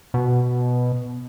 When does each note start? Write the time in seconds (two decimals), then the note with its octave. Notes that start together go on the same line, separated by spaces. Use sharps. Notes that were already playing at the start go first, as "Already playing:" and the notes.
0.14 B2